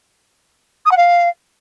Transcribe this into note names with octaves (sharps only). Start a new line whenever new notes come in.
D#6
F#5
F5